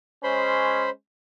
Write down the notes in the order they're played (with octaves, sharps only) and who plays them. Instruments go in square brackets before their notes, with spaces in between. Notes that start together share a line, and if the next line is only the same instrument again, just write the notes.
[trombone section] G#3 C#4 [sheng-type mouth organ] C5 B5 C6